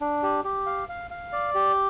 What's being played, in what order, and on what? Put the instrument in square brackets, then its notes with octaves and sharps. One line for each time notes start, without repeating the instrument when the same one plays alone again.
[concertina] D4
G4
G4
F5
F5
F5
D5
G4